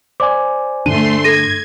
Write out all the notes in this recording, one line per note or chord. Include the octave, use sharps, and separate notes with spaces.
C5 D5 G#5 D6
G2 D3 A3 D4 C6 D#7
A4 G#6 A#6 D#7